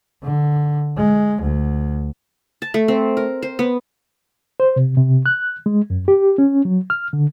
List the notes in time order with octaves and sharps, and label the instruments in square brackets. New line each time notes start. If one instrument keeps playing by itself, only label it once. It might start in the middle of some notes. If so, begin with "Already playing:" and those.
[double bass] D3
G#3
D2
[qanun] A5
A3
C4
A#4
C5
B3
[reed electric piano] C5
C3
C3
F#6
G#3
F#2
G4
C#4
F#3
F6
D3